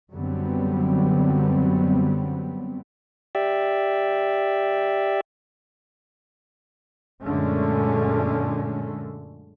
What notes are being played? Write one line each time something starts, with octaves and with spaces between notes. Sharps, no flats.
F#2 D3 F#3 G3 B3 C4
G4 D5 E5
F#2 A#2 D3 G#3 A3 C#4